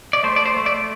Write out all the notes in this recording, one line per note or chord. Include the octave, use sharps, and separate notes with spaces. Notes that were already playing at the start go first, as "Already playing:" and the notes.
D5
A3 C5
D5
C5
A3
D5